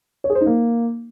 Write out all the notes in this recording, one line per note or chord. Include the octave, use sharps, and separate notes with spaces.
C#5
G#4
C5
D#4
A#3